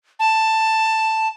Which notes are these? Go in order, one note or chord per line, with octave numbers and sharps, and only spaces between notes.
A5